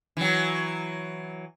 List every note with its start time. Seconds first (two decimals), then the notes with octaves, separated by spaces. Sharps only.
0.17 E3 F#3